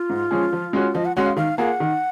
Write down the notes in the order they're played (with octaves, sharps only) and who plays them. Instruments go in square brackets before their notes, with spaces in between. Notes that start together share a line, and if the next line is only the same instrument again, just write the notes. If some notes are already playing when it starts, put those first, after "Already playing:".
Already playing: [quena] F4
[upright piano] G#2
F3 G#3 C#4 G#4
F3
G#3 C#4 F#4
[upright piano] F3 [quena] D#5
[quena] F#5
[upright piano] G#3 C#4 F#4 [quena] F#5
[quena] F5
[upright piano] D#3 [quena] F5
[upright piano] A#3 F4 G#4 [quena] F#5
[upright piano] D#3